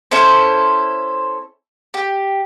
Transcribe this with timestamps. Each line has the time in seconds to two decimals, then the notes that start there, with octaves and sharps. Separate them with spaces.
0.11 C#4 E4 A4 C5
1.94 G4